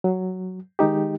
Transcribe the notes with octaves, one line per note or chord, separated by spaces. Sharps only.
F#3
D#3 G#3 D#4 G4